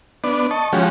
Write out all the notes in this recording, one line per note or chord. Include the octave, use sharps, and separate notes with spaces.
B3 D4 D5
D#5 A5 C#6
F3 G#3 C#4 F#4 G4